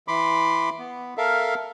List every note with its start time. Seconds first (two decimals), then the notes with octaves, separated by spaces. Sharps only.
0.08 E3 B5 C6 D6
0.79 B3
1.17 A4 A#4 E5 F5